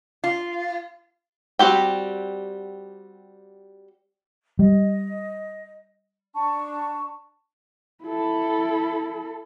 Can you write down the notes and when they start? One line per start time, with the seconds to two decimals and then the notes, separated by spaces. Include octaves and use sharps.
0.24 F4
1.59 G3 C4 F#4 G4 G5
4.59 G3 D#5
6.35 D4 A5 C#6
8.04 E4 A4